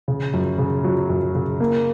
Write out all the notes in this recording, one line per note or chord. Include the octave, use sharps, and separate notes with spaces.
C#3
F#2
C#3
F#3
F#2
C#3
A#3